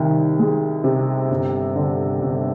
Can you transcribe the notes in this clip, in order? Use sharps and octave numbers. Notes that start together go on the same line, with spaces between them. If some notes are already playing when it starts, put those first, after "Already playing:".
Already playing: C2 D#3
G#3
C3
G1
D3
G1